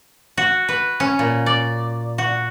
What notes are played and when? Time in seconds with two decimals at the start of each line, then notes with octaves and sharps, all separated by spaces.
0.37 F#4
0.68 B4
1.00 C#4
1.19 A#2
1.46 D5
2.18 F#4